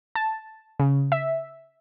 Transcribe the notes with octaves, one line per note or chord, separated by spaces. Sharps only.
A5
C#3
E5